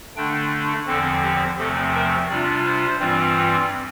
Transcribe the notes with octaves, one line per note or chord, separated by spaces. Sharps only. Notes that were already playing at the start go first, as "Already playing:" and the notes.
D3 A3 D4 G5
E2 D3 F3 C4 A4
G4
E2 C3 F3 A3 C4 A4
A#4
C3 G3 D4 F4 D5
C5
G2 E3 G3 C4 F4